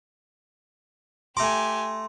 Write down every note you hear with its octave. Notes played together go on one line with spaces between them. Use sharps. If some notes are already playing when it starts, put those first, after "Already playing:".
A3 G4 G#5 A#5 C6 D6